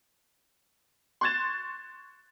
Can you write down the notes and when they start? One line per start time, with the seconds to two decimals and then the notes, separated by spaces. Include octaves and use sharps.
1.21 C6 C#6 F#6 G#6 A6 E7